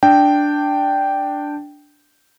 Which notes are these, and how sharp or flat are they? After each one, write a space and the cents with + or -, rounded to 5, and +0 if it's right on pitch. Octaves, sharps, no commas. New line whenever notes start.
D4 +0 G5 -5